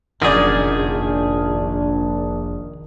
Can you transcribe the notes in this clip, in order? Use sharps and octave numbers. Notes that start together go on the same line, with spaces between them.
F1 A#1 F#2 D#3 D4 G#4 D5